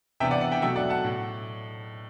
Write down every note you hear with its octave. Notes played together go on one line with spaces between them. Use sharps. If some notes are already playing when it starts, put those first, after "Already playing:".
C3 E3 B3 D4 E5 G5
D5 F#5
D5 F#5
E5 G5
B2 F#3 A3 E5 G5
D5 F#5
F#5 A5
A2